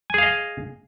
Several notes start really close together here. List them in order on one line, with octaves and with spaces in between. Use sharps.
G#5 G#4 F5 D#5